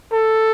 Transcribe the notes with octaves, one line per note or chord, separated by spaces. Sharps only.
A4